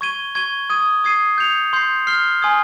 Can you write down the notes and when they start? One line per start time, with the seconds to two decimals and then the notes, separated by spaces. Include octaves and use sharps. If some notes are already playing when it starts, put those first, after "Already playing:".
0.01 C#6 G#6 D#7 G7
0.35 C#6 G#6 D#7 G7
0.70 D#6 G#6 D#7
1.04 D#6 G#6 C7 D#7
1.38 G6 C#7 F7
1.73 C6 G6 C7
2.07 F6 C7 G7
2.42 G#5 C6 D#6 G#6